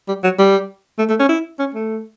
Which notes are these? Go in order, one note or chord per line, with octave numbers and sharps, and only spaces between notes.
G3
F#3
G3
A3
A3
C#4
E4
C#4
A3